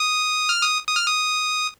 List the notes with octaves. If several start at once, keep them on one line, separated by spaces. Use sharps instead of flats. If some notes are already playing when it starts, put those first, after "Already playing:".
Already playing: D#6
F6
D#6
D#6
F6
D#6